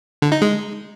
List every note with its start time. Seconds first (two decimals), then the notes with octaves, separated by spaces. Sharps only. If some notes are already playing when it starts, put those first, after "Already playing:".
0.22 D3
0.32 D#4
0.42 G#3